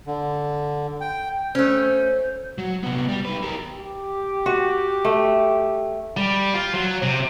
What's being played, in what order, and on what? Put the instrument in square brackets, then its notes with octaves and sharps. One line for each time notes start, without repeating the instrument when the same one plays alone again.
[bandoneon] D3
G5
[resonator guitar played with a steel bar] A3 C#4 [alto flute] C5
[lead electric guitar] F#3
C3 B3
G3
D#4 B4
G4 A#4
[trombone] G4
[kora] F#4
A3
[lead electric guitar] G3
F4
F#3
C3